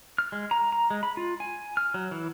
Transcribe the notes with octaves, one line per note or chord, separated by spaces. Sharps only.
F6
G#3
A#5
A#5
G#3
B5
F4
G#5
F6
F#3
E3